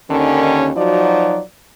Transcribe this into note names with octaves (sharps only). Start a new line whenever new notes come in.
D#2 D3 D#3 C#4
F3 F#3 D#4 F#4 D5